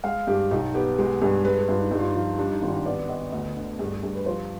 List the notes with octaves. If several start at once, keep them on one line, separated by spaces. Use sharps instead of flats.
G#3 F5
G2 G4
B1 D#4
B3 G4
G#3 G4
G2 G#4
G#3 B4
G#4
G2 F4
D#4
G2 D#4
F4
D#4
F3
G3 D4
D#4
G#1 F4
D#4
B3 D5
B3 D#5
D2 D#5
D3
G2 G#4
G4
G2 G#4
B4
F3 C5